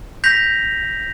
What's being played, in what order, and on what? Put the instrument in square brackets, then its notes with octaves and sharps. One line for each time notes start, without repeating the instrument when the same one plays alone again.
[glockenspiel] G6 A#6 B6 F7